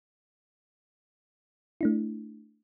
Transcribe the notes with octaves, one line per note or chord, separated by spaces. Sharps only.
A3 D4 E4